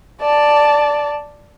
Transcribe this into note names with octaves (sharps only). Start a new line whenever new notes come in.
D5 A5